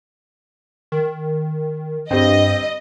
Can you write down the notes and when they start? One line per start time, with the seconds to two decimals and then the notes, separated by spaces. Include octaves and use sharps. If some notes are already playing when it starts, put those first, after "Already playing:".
0.92 D#3
2.11 G2 G3 C4 D#5